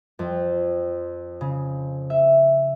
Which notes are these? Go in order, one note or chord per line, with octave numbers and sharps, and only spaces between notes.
F2
C#3
E5